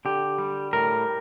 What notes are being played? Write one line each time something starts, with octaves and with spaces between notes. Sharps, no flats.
D3 G4
G3
A2 A#4